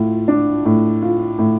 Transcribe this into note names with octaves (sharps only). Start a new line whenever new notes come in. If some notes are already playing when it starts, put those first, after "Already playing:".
Already playing: A2 F4
D4
A2
F4
A2